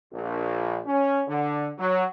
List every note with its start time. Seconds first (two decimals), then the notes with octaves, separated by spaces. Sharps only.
0.12 A#1
0.86 C#4
1.27 D3
1.78 F#3